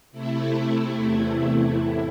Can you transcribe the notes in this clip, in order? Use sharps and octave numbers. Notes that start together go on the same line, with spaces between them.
C3 A3 E4
E2 C3 E3 A3
E4
A2